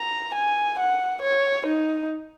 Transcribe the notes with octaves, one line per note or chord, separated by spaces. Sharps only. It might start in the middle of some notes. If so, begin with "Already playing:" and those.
Already playing: A#5
G#5
F#5
C#5
D#4